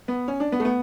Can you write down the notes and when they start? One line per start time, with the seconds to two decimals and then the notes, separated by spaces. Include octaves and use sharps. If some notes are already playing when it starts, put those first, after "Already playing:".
0.08 B3
0.28 C#4
0.40 D4
0.52 B3
0.60 A3
0.65 B3